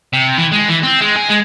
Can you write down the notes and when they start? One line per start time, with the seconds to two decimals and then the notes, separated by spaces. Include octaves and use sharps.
0.13 C3
0.38 E3
0.52 G#3
0.69 E3
0.83 C4
1.01 G#3
1.16 G#4
1.30 G#3